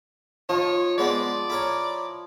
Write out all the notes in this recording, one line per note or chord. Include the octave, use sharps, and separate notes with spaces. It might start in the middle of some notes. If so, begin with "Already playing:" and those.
F3 D#4 C#5
G#3 B3 C4 D5
E4 A#4 C#5